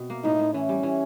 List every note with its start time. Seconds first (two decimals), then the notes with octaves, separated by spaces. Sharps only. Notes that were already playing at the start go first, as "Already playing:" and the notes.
Already playing: B2 C4
0.10 A#3
0.24 A2 D#4
0.39 A2
0.54 E3 C#4
0.69 G3
0.83 E3